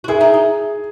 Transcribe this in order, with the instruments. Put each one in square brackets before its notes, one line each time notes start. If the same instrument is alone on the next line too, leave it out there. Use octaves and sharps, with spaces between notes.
[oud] F#4
[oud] E4 [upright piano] G#4
[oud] D#4
D#4